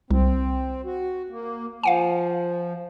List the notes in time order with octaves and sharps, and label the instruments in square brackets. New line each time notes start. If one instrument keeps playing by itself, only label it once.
[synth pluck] C2 [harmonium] C4
[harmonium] F#4
A#3
[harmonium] F3 [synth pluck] F5 F#5 G#5